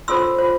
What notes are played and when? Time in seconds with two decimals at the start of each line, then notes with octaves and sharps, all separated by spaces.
0.08 F4 A4 C5 C6 E6
0.38 F4 C5